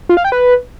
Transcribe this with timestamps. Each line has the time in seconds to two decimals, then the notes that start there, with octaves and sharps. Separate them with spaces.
0.09 F4
0.17 F5
0.24 G5
0.32 B4